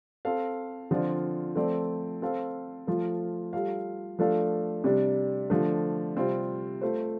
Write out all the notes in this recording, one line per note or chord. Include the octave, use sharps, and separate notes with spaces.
C4 A4 F5
D3 F3 C4 F4 D5
F3 A3 C4 A4 D5
C4 A4 F5
F3 A3 F4
G3 F4 A4 F5
F3 A3 D4 A4 F5
C3 G3 D4
D3 F3 A3 D4
C3 G3 C4 F4
A3 F4 C5